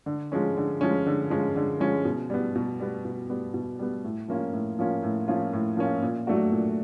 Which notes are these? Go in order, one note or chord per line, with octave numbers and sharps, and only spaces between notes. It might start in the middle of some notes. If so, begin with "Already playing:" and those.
D3
F3 G#3 C#4
D3
F3 G#3 C#4
D3
F3 G#3 C#4
D3
F3 G#3 C#4
B2
G3 B3
B2
G3 B3
B2
G3 B3
B2
G3 B3
A2
F3 A#3 C#4 F4
A2
F3 A#3 C#4 F4
A2
F3 A#3 C#4 F4
A2
F3 A#3 C#4 F4
A#2
F#3 A3 D4 F#4
A#2